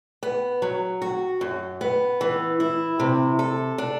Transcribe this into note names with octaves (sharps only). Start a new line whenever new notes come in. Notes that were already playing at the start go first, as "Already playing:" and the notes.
B3
F#3
F#4
F#2
B3
E3
E4
C3
A4
D4